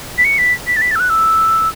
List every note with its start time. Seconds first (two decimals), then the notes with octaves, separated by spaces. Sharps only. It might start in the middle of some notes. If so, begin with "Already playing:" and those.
0.18 B6
0.25 C#7
0.38 B6
0.67 B6
0.76 A6
0.81 B6
0.91 A6
0.95 E6
1.00 F#6
1.10 E6